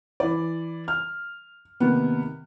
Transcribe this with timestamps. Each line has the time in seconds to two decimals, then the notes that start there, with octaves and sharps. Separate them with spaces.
0.20 E3 D5
0.88 F6
1.80 C3 D#3 A#3 B3